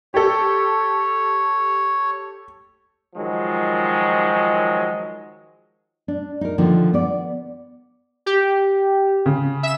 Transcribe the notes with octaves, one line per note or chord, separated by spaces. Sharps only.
G4 A4 C#5
D#3 F3 F#3 G#3
D4
D#4 A#4
D3 D#3 F3 A#3
B3 D5
G4
C#3
E5 E7